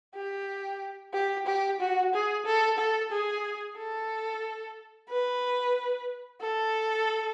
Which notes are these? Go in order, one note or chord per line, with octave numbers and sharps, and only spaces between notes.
G4
G4
G4
F#4
G#4
A4
A4
G#4
A4
B4
A4